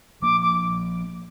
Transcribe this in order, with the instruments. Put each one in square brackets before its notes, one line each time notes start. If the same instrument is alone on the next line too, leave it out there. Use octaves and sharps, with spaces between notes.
[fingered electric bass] F3 A#3 D4 [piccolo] D6
[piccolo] D6